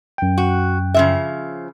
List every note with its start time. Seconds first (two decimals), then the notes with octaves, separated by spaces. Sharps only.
0.18 F#2 G5
0.38 F#4
0.94 C#3 F3 E5